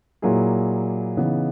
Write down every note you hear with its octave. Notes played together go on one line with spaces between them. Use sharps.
A#2 F#3 A#3 E4 G#4
C#3 E3 B3 D#4